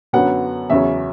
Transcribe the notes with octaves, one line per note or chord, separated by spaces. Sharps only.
F#2 D3 F#3 B3 F#5
E2 C#3 F#3 C#4 E5